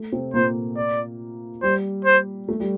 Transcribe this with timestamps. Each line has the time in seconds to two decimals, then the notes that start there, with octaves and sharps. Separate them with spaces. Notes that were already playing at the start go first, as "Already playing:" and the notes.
Already playing: A3
0.12 C3 C4
0.33 A#2 A#3 C5
0.77 D5
1.62 G3 C5
2.05 C5
2.49 A3
2.60 G3